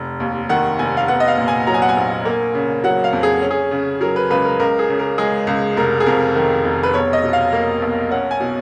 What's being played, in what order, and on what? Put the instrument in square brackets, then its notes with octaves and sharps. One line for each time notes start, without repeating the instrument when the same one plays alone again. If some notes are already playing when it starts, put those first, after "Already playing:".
Already playing: [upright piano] F1
D#2
D#3 F#5
F1 G#5
F5
B3 F#5
D#5
F5
A#2
G#5
F#3 A#5
G#5
F#5
G#5
A#1
A#3
C#3
F#3 F#5
F5
F2
G#4
C#4
G#4
C#3
F#3 A#4
B4
C#2 B4
A#4
C#2 A#4
G#4
C#3
A#4
G#3 G#4
C#2
F1 A#4
G#4
F2 A#4
D#3
F1
B4
B1 C#5
D#5
B2
F5
A#3
B1
C#4 F#5
G#5
B2